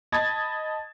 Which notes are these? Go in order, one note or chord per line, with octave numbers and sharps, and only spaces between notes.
D#5 A5 B5 G#6 A6